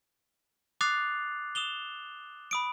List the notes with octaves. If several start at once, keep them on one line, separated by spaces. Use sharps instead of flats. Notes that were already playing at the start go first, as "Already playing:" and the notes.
D6 D#6 F#6 A6 C7 F7
D#6 E7 F7 G7
B5 D#6 D7